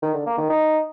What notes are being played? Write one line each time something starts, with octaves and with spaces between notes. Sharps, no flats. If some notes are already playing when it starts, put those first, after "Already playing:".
D#3
D3
A#3
D#3
D#4